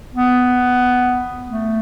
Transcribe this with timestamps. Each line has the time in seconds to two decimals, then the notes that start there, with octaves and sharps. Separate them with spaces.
0.15 B3
1.48 A3